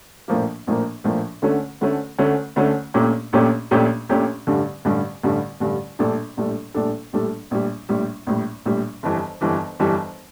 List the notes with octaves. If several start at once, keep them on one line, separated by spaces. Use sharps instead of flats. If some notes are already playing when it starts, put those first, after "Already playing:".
A#1 A2 F3 A#3
A#1 A2 F3 A#3
A#1 A2 F3 A#3
D2 D3 A3 C#4
D2 D3 A3 C#4
D2 D3 A3 C#4
D2 D3 A3 C#4
A#1 A#2 A3 C#4 G4
A#1 A#2 A3 C#4 G4
A#1 A#2 A3 C#4 G4
A#1 A#2 A3 C#4 G4
A1 G2 D3 G3
A1 G2 D3 G3
A1 G2 D3 G3
A1 G2 D3 G3
A#1 A2 G3 D4 A4
A#1 A2 G3 D4 A4
A#1 A2 G3 D4 A4
A#1 A2 G3 D4 A4
A#1 A2 G3
A#1 A2 G3
A#1 A2 G3
A#1 A2 G3
G1 F2 E3 G3
G1 F2 E3 G3
G1 F2 E3 G3